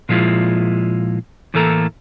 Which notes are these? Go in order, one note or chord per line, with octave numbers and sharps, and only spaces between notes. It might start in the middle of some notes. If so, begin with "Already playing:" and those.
A#2 F3 G#3 E4 F4
A2 E3 A3 A#3 A4 A#5